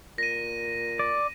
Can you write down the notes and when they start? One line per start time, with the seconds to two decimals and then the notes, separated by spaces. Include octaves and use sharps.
0.18 A#2 A#6 D#7
0.99 D5